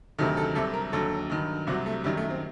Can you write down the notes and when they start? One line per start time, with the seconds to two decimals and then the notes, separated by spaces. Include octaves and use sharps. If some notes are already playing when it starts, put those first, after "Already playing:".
0.18 D2 C3 D#3 F#3 A4
0.37 A4
0.55 C2 C3 F#3 A4
0.73 A#4
0.93 D#2 D3 F#3 A4
1.30 G2 D#3 F#3
1.67 C2 C3 F#3 F#4
1.86 A3
2.04 F#2 D#3 F#3 G3
2.17 A3
2.30 C4